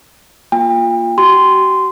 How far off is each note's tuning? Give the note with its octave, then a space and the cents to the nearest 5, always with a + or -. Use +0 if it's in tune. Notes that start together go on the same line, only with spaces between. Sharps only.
A#3 +15 F4 +0 G5 +40
F#4 +45 C6 -15